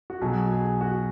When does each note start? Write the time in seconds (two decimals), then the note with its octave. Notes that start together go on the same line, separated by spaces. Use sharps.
0.10 F#4
0.21 B1 B2 F#3 G#4
0.52 G#4
0.81 F#4